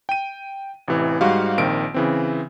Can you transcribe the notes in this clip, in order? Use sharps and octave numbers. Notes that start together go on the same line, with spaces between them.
G5 D#7
A1 C3 E3
G#2 G3 F#4 F5
A#1 D#3 C4 D7
C#3 E3 C4